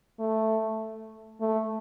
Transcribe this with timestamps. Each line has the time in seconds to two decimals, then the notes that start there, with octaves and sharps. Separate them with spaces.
0.20 A3
1.41 A3